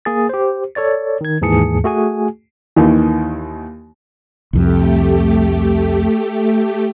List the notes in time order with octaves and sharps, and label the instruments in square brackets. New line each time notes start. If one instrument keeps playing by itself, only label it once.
[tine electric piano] A#3 G#4 A6
G4 C5
A4 C#5 D5 A6
D#3 G#6
D#2 G#2 E3 G#4 A5 C#7
A3 F#4 G#4 G#5
[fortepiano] D#2 D#3 E3
[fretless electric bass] C2 F2 [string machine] A3 G4